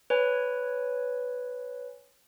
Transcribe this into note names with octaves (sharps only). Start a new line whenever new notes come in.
B4 C#5 G#5